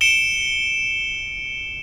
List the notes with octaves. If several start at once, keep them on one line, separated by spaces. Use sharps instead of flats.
C#7 D7 E7 G7